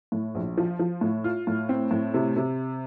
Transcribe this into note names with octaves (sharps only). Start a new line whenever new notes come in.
A2
A#1
F3
F3
A2
F4
A2
C4
A2
C3
C3